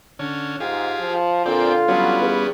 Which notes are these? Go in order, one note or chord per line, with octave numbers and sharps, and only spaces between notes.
D3 C#4
G#2 F4 G4 G#4
F3
A#2 D3 C4 F4 D5 G5
D3 F#3 G3 B3 C#4
E2